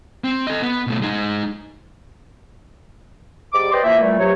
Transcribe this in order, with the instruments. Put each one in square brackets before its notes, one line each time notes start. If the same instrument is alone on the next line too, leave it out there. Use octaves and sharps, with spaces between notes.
[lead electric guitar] C4
A4 D#5
B3
B2 A3
G#3 D#4
[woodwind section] G#2 G3 D5 D6
B4 C5 D5 D#5 G5 C6
E3 F3 A#3 E5
A#2 E3 G3 A3
G2 C3 F#3 A3 C#5